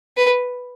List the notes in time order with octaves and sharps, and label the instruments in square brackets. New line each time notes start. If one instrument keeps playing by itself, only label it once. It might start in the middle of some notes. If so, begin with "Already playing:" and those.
[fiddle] B4